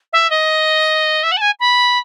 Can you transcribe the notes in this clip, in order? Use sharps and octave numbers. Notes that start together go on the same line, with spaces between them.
E5
D#5
E5
F#5
A5
G#5
B5